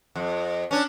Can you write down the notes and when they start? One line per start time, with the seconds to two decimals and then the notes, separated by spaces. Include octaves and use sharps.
0.16 F2
0.71 C#4 D4